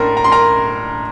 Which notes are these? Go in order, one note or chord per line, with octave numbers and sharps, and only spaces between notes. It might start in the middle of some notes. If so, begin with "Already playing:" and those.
Already playing: A2 A3 D4 A#4 A#5 C6
A#5
C6
A#4 A#5